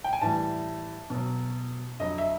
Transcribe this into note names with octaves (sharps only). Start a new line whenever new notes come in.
G5
G#5
A2 E3 G3 A5
B2 F#3
F2 D3 F#3 D#5
E5